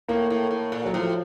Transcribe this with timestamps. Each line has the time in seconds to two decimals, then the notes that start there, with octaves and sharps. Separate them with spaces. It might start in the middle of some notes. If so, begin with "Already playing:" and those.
0.08 A2 A#3
0.30 A2
0.51 A2
0.72 A#2
0.85 F#3
0.93 A2 F3